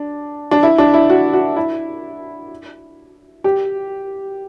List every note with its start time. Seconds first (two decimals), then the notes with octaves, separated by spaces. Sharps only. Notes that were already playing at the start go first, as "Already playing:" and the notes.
Already playing: D4
0.51 D4
0.63 E4
0.78 D4
0.94 E4
1.10 F#4
1.33 F#4
1.56 E4
3.44 G4